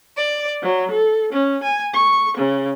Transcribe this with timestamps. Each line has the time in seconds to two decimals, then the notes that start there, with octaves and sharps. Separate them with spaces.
0.16 D5
0.61 F#3
0.91 A4
1.31 C#4
1.62 G#5
1.94 C#6
2.36 C#3